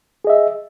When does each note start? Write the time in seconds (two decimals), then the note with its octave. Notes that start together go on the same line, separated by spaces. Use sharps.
0.24 G#4
0.27 D#5
0.30 E5